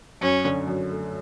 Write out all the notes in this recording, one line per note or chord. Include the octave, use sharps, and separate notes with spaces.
F#2 C#4
D3
F#2
A3